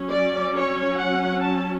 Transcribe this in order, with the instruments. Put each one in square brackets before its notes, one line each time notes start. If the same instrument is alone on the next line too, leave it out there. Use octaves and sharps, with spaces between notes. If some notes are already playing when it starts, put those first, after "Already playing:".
Already playing: [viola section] F#3 C#4
D5
C#5
F#5
A5